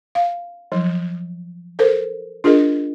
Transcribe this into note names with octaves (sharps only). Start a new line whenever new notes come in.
F5
F3 F#3
A4 A#4 C5
D4 F4 G#4 A#4 D#5